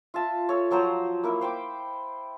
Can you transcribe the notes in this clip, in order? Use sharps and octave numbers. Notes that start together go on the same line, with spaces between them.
F4 E5 A5
A4 C#5
F3 F#3 C5 A#5
A#3 E4 A#4
C5 G5 B5 D6